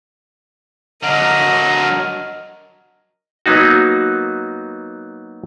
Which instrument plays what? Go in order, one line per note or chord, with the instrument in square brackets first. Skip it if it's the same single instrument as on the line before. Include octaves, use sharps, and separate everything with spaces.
[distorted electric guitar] D3 F#3 [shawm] A#4 [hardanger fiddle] D#5
[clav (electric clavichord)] F#3 A#3 B3 D#4 F#4